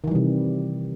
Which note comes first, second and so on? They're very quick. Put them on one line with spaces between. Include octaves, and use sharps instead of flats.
D#3 E3 G3 C3